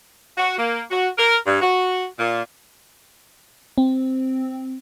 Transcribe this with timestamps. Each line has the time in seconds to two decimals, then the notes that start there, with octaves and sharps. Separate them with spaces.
0.38 F#4
0.58 A#3
0.91 F#4
1.19 A#4
1.47 G2
1.62 F#4
2.19 A#2
3.78 C4